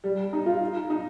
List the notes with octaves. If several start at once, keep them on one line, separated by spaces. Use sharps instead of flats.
G3
D#4
F4
D#4